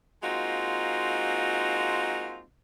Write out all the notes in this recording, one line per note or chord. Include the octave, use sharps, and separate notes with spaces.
G#3 A#3 C4 D#4 F4 F#4